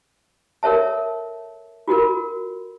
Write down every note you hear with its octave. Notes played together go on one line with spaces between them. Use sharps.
A4 A#4 C#5 E5 A5
F4 F#4 A4 A#4